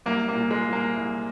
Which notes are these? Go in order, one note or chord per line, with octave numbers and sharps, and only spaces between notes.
C2 A#3
A#3
A#2
G#3
C2
A#3
C2